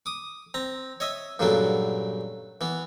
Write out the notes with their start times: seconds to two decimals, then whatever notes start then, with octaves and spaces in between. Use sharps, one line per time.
0.06 D6 D#6
0.54 C4 A#5
1.00 C#5 D#5 E5
1.39 G2 A#2 C#3 F#3 A3 B3
2.61 E3 B3